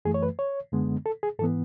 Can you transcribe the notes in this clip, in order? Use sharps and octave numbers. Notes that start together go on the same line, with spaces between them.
F#2 E3 A3 G#4
C#5
B4
C#5
F#2 D3 G#3 B3
A4
G#4
G#2 E3 B3 A4